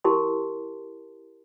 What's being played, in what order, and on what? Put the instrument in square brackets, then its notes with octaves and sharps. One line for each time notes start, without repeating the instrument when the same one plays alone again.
[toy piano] E4 G4 A#4 A5 C6